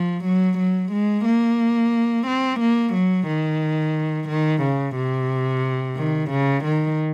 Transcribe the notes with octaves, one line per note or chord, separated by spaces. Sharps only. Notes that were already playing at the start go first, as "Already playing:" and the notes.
Already playing: F3
F#3
F#3
G#3
A#3
C4
A#3
F#3
D#3
D#3
C#3
C3
D#3
C#3
D#3